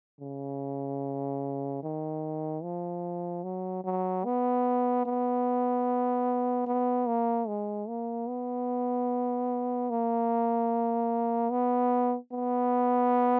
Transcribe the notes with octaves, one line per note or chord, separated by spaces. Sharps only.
C#3
D#3
F3
F#3
F#3
B3
B3
B3
A#3
G#3
A#3
B3
A#3
B3
B3